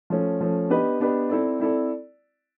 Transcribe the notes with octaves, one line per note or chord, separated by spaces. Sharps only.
F3 A3 C#4
F3 A3 C#4
B3 D4 G4 B4 D#5
B3 D4 G4 B4 D#5
C4 E4 A4 D5
C4 E4 A4 D5